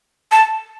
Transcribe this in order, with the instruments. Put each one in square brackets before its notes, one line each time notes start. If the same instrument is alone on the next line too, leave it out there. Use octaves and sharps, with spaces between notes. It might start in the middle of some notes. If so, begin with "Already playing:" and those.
[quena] A5